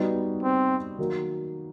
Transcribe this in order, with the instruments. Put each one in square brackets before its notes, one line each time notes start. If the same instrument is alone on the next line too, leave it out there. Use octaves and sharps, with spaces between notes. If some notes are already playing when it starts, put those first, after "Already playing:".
Already playing: [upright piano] G3 B3 D#4 F#4
[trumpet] C4
[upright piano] D#3 F#3 A#3 D#4